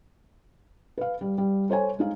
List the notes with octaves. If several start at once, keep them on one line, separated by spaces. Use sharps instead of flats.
B4 F5
G3
G3
A4 C5 C#5 G#5
G#3 D#4 F5